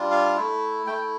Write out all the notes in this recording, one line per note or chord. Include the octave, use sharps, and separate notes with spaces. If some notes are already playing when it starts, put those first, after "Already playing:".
Already playing: G3 D4 F4
F5
A3 E4
A3 E4 G5